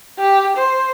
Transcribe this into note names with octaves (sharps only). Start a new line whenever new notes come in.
G4
C5